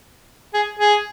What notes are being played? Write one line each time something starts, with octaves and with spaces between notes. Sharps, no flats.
G#4
G#4